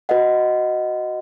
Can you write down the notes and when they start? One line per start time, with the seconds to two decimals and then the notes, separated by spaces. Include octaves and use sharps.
0.09 F#4 B4 D#5 F#5